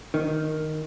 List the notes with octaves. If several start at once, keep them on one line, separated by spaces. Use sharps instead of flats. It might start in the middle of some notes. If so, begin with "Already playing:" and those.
D#3